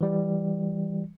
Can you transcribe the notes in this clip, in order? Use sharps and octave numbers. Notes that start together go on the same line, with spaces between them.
E3 G3